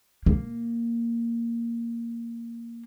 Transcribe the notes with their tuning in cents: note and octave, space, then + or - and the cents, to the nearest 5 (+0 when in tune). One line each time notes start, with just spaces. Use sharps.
A#3 -5